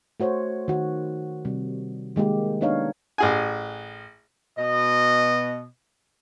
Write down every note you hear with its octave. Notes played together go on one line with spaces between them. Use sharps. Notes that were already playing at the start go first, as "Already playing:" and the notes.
A3 F#4 C5 C#5
D#3 F#4
C3 G3
D#3 G#3 A#3 G4
B3 D4 D#4 C#5 F5
A1 G#4 G#5
B2 D#5